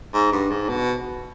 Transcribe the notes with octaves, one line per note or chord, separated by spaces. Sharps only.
G#2
G2
G#2
B2